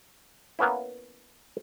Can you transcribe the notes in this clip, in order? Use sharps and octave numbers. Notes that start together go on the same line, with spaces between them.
A#3 B3 C#4 E4